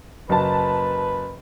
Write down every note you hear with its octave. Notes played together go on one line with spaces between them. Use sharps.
F#1 B4 A5